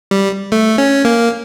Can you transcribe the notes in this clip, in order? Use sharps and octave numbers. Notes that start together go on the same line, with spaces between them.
G3
A3
C#4
A#3